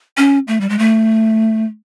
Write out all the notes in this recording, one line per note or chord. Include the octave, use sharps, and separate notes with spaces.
C#4
A3
G3
G#3
A3